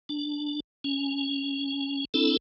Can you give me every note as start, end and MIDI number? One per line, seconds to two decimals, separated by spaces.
0.09 0.60 62
0.84 2.05 61
2.14 2.37 60
2.14 2.37 62
2.14 2.37 64
2.14 2.37 69